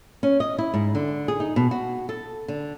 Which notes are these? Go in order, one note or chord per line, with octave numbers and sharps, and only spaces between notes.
C#4
D#5
E4
G#2
D3
G#4
D#4
B2
F#4
A4
D3